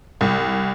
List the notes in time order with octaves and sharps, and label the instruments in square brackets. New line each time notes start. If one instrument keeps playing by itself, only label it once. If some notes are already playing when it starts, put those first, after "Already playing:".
[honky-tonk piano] C2